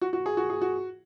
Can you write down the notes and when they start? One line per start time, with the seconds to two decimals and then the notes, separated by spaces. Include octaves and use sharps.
0.01 F#4
0.13 F#4
0.26 G#4
0.37 F#4
0.50 G#4
0.62 F#4